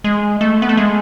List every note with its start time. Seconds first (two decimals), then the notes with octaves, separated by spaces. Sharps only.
0.04 G#3
0.41 A3
0.62 B3
0.69 A3
0.77 G#3